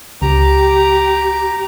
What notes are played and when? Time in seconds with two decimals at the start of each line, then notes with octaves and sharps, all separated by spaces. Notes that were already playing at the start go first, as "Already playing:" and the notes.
0.22 C#2 G4 A#5